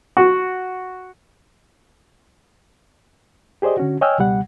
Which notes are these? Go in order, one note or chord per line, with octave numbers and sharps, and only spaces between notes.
F#4
G4 G#4 C5 D5 D#5
D3 C#4 F#4
C#5 D#5 G5 G#5 E6 F6
C#2 B2 G3 F#5